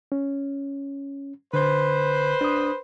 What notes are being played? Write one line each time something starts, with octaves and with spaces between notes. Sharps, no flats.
C#4
D3 B4 C5
D4 D#6